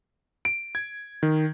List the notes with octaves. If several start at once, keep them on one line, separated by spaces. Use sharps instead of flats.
D7
G#6
D#3